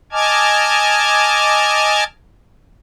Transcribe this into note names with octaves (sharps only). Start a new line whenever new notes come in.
D#5 G#5 A5 D6 F6 G#6